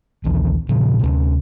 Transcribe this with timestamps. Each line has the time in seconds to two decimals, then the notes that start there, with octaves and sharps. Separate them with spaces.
0.25 A#1 D#2 E3
0.69 A#2 C#3 F3
0.99 D2 C3